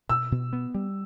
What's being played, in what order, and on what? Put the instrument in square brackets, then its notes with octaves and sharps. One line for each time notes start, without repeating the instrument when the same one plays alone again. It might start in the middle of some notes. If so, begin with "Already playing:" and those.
[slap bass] B2 [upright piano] E6
[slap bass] B2
B3
G3